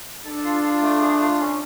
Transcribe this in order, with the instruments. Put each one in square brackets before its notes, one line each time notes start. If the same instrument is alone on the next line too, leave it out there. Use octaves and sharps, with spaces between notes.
[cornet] D4 [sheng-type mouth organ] A4
[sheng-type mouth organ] F4
F4
A3
G#4
F4
C#4